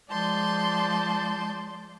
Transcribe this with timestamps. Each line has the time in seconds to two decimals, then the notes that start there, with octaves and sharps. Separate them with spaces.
0.11 F3 G#3 D5 A5 C6 G6